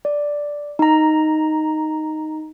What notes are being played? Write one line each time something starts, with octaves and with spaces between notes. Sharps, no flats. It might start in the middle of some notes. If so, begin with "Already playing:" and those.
D5
D#4 A#5